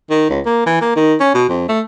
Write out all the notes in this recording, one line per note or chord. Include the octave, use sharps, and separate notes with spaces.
D#3
C#2
A#3
E3
A#3
D#3
C#4
B2
F2
A3